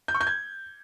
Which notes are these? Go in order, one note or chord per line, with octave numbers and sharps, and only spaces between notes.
G6
C#6
G6
G#6